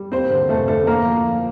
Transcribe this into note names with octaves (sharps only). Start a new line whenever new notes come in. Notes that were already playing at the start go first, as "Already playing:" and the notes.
Already playing: G3
D#2 C4 C5
D3
F1 A3 A4
D3 A3 A4
D3 A#3 A#4
F3
F3